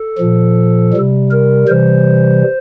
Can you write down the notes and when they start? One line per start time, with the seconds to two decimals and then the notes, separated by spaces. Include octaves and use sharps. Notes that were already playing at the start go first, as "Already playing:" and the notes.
Already playing: A4
0.18 A#2 F3
0.93 C3 G3
1.31 A#4
1.68 C3 E3 G3 C5